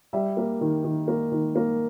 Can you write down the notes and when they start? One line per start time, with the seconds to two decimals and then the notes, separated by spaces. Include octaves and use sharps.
0.13 G3 E5
0.37 A#3
0.61 D#3
0.84 D#3
1.08 A#3
1.32 D#3
1.56 A#3